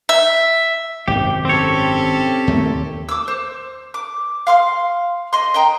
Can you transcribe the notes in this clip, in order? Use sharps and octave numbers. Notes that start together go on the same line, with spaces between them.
E5
G#1 F#2 C3 G4
C4 C#4 G4 A4 C#5
D#2 D#3 A3
D6 E6
C5
D6
F5 C6 F6
D#5 C6
D#5 G5 A#5